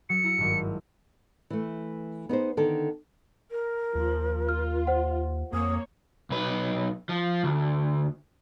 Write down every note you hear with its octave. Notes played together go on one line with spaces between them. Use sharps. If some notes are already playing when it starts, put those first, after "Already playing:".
F#3 C#7
E4 A#5
G#1 G2
E3 A3
B3 D#4 G#4 C5
D3 D#3 A4
A#4
D#2 F3
F4 F6
C5 F#5
F2 A#3 C#5 D#6
B1 B4
F3
D2